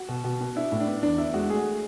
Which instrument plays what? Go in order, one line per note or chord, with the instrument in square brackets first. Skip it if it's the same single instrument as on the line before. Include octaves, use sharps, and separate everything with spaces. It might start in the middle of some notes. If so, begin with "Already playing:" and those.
Already playing: [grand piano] F#4
B2
B2
B3
D4 E4
A2
D4
B3
E2 D4
E2 E4
G#3 F#4
A3 G#4